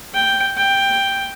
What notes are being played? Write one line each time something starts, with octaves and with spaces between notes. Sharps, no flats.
G5
G5